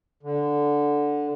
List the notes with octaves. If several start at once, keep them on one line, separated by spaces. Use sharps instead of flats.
D3